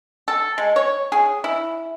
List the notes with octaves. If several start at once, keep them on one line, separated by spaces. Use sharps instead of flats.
A4
G#3
C#5
G#4
E4